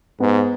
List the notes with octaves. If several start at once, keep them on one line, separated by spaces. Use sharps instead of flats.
G#2 B3